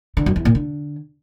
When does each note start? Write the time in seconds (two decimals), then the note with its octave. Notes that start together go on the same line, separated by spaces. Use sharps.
0.17 D3
0.26 F#2
0.36 E2
0.45 A#2
0.55 D3